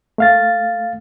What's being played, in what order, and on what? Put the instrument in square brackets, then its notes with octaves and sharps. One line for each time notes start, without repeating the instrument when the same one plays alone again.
[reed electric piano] A3 F5 A6